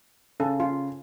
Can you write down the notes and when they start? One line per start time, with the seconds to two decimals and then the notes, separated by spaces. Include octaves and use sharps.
0.40 C#3 A4
0.60 F4